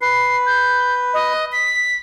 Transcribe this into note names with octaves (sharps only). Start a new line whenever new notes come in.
B4 C7
G6
D#5
B6